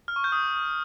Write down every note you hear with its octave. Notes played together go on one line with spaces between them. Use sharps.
F6
C#6
G6
D#6